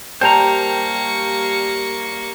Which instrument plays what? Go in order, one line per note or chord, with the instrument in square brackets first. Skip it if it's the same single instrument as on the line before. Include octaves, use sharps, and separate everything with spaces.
[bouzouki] G3 A#4 [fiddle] A#3 C#6 [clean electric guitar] C5 A#5 [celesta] G5 A5